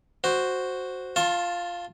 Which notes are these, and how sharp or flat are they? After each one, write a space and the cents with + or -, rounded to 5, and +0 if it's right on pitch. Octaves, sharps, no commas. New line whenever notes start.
F#4 +0 C5 +0
F4 +0 A5 +0 C6 +40